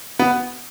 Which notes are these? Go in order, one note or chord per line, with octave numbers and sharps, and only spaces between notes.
B3